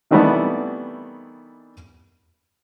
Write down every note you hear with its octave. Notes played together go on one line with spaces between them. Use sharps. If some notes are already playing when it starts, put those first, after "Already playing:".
C3 D#3 E3 G3 A3 B3